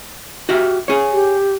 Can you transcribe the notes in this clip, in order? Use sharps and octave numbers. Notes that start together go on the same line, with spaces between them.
F#4 G4 E5
G#4 C#5
G4